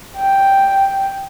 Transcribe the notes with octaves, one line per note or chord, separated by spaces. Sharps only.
G5